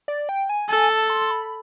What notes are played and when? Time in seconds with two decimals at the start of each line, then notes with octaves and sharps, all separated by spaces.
0.08 D5
0.29 G5
0.49 G#5
0.69 A4 G#5
0.90 A5
1.10 C6
1.31 B5